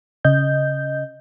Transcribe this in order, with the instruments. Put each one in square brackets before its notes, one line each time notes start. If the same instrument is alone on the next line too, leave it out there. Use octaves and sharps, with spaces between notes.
[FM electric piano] C#3 D#5 G6